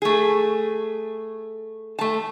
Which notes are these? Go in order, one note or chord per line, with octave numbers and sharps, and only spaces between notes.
A3 G#4
A3 A5